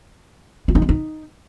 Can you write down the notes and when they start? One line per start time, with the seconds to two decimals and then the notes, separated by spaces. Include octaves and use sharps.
0.68 F4
0.75 D#4
0.82 B3
0.89 D#4